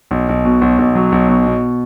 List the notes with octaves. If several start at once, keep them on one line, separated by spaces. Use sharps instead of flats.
B1
B1
B2
B1
B1
F#3
B1
B2
B2